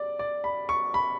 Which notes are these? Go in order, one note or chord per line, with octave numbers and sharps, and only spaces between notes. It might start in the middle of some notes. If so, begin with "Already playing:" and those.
Already playing: D5
D5
B5
C#6
B5